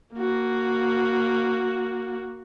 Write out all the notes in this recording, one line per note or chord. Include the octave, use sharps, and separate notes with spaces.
A#3 F#4